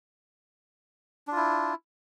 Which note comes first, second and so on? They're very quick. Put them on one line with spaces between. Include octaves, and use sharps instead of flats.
D4 F4 E4